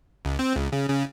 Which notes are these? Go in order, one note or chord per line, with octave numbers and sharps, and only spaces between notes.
C#2
C4
C#2
C#3
C#3